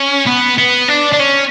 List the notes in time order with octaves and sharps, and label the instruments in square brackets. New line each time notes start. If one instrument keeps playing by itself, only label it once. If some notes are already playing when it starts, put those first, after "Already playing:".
Already playing: [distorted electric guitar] C#4
B3
B3
D4
D4
C#4